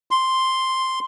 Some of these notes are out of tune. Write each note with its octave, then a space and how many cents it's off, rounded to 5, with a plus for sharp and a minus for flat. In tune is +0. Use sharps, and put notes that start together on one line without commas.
C6 +0